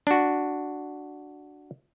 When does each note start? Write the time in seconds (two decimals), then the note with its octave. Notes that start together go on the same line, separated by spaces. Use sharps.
0.07 D4 F#4